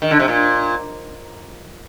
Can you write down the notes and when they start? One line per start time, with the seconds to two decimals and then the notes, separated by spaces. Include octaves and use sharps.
0.02 D#3
0.11 D3
0.19 C3
0.28 A#2